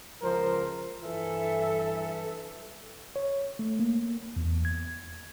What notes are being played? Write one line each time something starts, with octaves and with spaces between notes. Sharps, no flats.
C#2 F3 A#4 C5
G2 E3 A4 E5
C#5
A3
A#3
E2
G#6